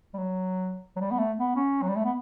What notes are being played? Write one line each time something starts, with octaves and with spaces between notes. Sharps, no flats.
G3
F#3
F#3
G3
B3
A3
B3
C#4
F#3
G3
A3
B3